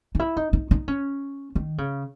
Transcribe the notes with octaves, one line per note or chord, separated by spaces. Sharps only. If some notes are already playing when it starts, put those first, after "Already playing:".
D#4
E4
D#4
D#4
D#4
C#4
D#3
C#3